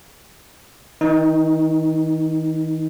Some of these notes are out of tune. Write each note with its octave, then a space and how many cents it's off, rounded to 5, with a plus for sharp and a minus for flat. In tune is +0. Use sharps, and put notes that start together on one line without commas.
D#3 +45 D#4 +0